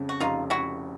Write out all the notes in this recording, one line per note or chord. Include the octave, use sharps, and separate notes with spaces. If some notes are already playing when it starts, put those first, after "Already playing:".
Already playing: F2 C#3
F#4
F1 D#4 F4
E4 F#4